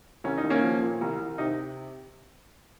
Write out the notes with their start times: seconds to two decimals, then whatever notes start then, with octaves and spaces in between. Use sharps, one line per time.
0.24 C2 C#4
0.38 D#4
0.44 C2
0.50 A#3 C#4
0.63 F3
0.82 A#2
1.01 C2
1.20 C2
1.38 C3 D#4